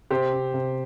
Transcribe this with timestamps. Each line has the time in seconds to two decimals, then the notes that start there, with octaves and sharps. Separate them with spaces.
0.11 C3 G4 C5
0.32 C4
0.54 C3